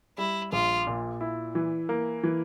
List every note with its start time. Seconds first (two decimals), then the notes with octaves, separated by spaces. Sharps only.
0.18 G3 E4
0.52 A#1 F4
0.87 A#2
1.21 E4
1.55 E3
1.89 A#3
2.24 E3